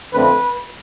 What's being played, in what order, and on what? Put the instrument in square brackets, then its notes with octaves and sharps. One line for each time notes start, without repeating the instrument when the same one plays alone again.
[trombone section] F2 D3 A3 C4 B4